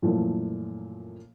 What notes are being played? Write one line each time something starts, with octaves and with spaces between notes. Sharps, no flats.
F#2 A#2 E3 F3 A3